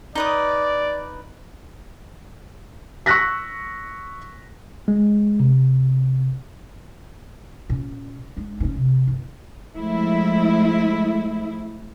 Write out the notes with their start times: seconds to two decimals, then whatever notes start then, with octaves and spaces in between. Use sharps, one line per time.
0.15 D#4 B4 D5 D#6
3.06 C#6 E6 F#6 A#6 B6
4.88 G#3
5.40 C3
7.70 A#2 C#4
8.37 G#3 D4
8.60 G2 C#4
8.76 C3
9.07 G1
9.76 F3 G#3 A3 E4